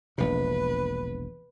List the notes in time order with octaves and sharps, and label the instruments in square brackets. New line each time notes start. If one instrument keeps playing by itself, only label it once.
[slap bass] E1 A#1 C3 [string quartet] B4